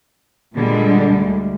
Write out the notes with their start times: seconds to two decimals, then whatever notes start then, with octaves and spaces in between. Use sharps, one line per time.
0.55 A#2 D3 G3 G#3
1.14 D2